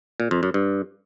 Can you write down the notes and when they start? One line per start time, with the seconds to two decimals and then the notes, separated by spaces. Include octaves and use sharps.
0.20 A#2
0.31 F2
0.43 F#2
0.54 G2